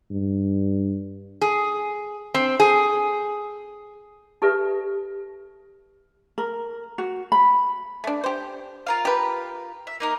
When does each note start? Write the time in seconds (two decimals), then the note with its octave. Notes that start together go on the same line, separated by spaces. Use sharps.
0.11 G2
1.41 G#4
2.34 C4
2.60 G#4
4.42 D#4 G4 A4 B4 D5 E5
6.38 A#4
6.98 F#4
7.32 B5
8.04 A3 D4
8.24 G4 C5
8.87 F4 A#4 F5
9.05 G4 B4
9.87 E5
10.00 A#3 D#4 A#4